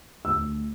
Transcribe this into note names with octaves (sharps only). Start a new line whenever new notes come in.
D2 E6